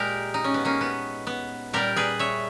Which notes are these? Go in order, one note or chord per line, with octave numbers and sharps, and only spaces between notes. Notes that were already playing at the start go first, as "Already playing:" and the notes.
Already playing: A#2 G#3 G4 A#4
D#4
C#4
B3
A#3 C#4
B3
B3
A#2 G3 G4 A#4
G#4 B4
C#5 E5